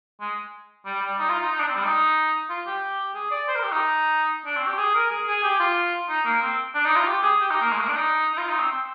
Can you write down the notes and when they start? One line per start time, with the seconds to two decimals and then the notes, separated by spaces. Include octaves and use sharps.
0.20 G#3
0.86 G3
1.02 G3
1.19 D#4
1.29 F4
1.41 D#4
1.52 D#4
1.60 D4
1.68 C4
1.75 G3
1.84 D#4
2.49 F4
2.66 G4
3.15 G#4
3.31 D5
3.48 C5
3.56 A#4
3.64 G4
3.72 D#4
4.46 D4
4.56 C4
4.67 G4
4.78 G#4
4.94 A#4
5.11 G#4
5.27 G#4
5.43 G4
5.60 F4
6.09 D#4
6.25 A#3
6.41 C4
6.75 D4
6.85 D#4
6.96 F4
7.07 G4
7.23 G#4
7.40 G4
7.50 D#4
7.61 A#3
7.72 G#3
7.81 A#3
7.88 D4
7.96 D#4
8.33 D#4
8.38 F4
8.49 D#4
8.59 C4
8.71 C4